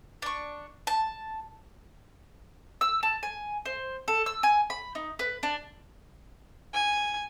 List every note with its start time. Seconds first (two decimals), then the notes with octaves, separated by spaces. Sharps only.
0.22 D4 C#6
0.87 A5
2.81 E6
3.03 A5
3.23 G#5
3.66 C5
4.08 A4
4.26 E6
4.43 G#5
4.70 B5
4.95 D#4
5.19 B4
5.43 D4
6.74 G#5